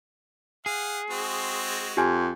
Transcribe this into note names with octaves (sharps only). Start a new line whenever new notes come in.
G#4 F5 F#5
G#3 C4 F#4
F2 G4 G#5